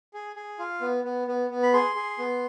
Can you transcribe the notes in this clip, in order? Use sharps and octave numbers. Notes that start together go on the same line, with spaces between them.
G#4
G#4
F4
B3
B3
B3
B3
B5
G#4 C6
G#4
B3